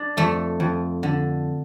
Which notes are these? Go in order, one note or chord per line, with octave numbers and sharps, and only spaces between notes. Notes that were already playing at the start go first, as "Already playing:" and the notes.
Already playing: D4
F2 A3
F2
D3